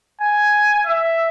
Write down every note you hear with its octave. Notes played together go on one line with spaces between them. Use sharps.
G#5
E5